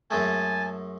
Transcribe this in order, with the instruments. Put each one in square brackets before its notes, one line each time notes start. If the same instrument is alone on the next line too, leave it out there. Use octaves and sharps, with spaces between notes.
[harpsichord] F#2 G#3 A3 [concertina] G#5 A5